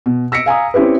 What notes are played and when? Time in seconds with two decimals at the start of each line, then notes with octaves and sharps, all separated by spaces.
0.06 B2
0.32 E6 A#6 B6 C#7 D7
0.46 F5 G#5 A#5 D#6
0.74 C4 C#4 E4 G4 B4